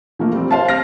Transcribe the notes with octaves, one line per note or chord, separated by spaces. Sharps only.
F3 A3 A#3
G3 C4
C5 F5 A5
F6 A#6